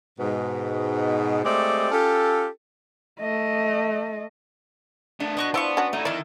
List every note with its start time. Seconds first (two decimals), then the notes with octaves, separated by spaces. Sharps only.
0.19 G#2 B2
1.44 G#3 A3 C4 G4 D5 D#5
1.91 C#4 F4 G4 A4
3.20 A3 D#5
5.20 A3 B3 D4
5.37 B3 F#4 D#5 C#6 F#6
5.54 F3 B3 E4 D5 C6 C#6
5.77 C#4 D4 F#4
5.93 A3 D#4 E4
6.05 F2 D#3 E4 A4 D5